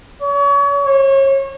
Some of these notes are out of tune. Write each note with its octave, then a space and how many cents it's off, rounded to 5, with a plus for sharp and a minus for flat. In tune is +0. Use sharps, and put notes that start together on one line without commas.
C#5 +35
C#5 -35